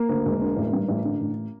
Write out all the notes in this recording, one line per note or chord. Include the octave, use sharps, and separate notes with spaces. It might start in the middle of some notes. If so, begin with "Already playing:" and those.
Already playing: A#3
D2
E1
D3
A1
G2
A1
D3
A1